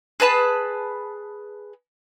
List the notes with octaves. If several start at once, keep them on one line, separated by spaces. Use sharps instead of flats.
G#4 B4 A5 B5